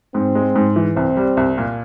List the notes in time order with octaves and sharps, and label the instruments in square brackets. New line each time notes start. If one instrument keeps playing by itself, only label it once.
[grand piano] G#2 [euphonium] C4
[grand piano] G#3
G#2
E3
[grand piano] C2 [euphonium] C4
[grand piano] G3
C2
A#2